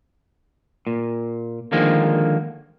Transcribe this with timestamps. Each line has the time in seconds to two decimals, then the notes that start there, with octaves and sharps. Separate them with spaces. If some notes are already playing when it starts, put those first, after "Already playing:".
0.87 A#2
1.72 D3 D#3 F3 G#3 A#3